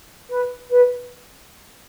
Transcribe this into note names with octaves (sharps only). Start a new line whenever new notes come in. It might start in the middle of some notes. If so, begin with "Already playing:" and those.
B4
B4